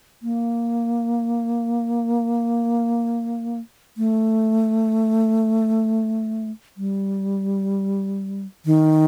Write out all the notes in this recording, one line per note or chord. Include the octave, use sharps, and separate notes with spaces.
A#3
A3
G3
D#3